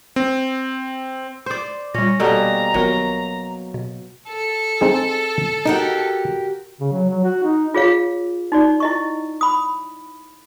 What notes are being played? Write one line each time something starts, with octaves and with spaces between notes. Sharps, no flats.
C4
C5 D5 C6 D6
A#2 G3 C#4 A#6
B2 G3 A#3 A4 F#5 A5 A#5
G#1 F#3 B3 A#4
B2
A4
C4 D#4 G#4
D#4 F#4 G4 A#4
C#3
F#3
F#3
F#4
D#4
F4 G#4 C#5 F5
D#4 F#4 D5
E4 D#5 C#6
B5 D#6